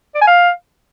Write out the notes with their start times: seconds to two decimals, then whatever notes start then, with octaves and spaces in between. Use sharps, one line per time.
0.15 D5
0.21 G#5
0.27 F5